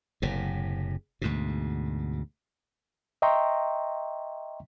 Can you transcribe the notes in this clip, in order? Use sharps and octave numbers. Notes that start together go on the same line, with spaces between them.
F#1 A2 C3
D2 G#2 B2
D#5 E5 G5 A#5 C6 C#6